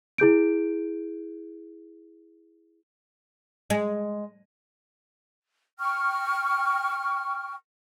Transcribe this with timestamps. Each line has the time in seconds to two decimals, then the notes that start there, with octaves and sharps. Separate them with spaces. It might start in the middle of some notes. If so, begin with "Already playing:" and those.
0.18 E4 G#4 G6 D7
3.70 G#3
5.80 G5 C#6 F6